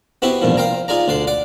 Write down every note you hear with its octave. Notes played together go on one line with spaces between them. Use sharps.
B3 C4 E4 F#4 G4 E5
E2 G2 A#2 D#3 F3
C5 F5 G5 A#5
D#4 F4 G#4 D5 A#5
D2 D3 D5 C6
D5 F#5 D6